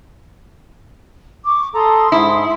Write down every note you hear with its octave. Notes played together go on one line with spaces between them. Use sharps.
C#6 D6
A4 A#5 C6 D#6
G#2 E4